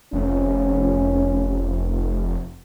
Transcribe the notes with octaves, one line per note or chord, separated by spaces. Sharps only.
F1 C#4